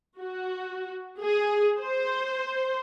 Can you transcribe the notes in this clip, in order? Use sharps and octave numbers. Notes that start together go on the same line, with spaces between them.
F#4
G#4
C5